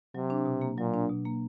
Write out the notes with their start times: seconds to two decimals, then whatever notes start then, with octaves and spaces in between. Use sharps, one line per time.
0.15 C3 F#3
0.30 D4
0.45 B2
0.61 A#3
0.78 A#2 F#3
0.94 D4
1.09 B2
1.26 A#3